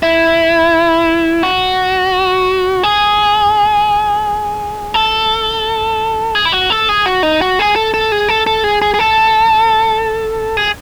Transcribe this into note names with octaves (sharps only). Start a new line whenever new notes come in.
E4
F#4
G#4
A4
G#4
E4
F#4
A4
G#4
F#4
D#4
F#4
G#4
A4
A4
G#4
A4
A4
G#4
G#4
G#4
A4
G#4